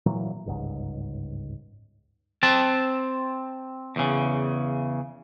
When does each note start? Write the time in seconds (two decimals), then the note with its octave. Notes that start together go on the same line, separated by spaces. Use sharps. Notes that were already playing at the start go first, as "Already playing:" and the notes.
0.06 A#2 E3 F#3
0.46 G1 C#2 G#2
2.43 C4 A5
3.96 E2 C#3